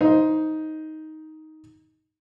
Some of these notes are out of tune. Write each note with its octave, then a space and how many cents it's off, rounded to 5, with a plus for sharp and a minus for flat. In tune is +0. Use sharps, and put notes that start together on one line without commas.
D#4 +10 C5 +0